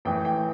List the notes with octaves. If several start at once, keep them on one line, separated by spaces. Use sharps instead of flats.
A1 A2 E3 G5
G5